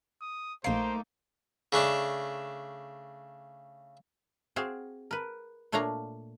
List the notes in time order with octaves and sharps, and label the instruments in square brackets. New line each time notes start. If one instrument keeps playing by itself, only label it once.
[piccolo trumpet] D#6
[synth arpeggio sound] A#1 C7 [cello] A3 [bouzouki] A#3 D#4 [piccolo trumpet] C5
[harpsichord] C#3 A3 D4
[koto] C4 F#4 G#4 F5
A#4 B4
A#2 A3 D4 C#5 F5 A#5